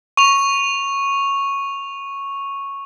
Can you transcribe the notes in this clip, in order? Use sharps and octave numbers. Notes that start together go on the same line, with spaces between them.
C#6 F7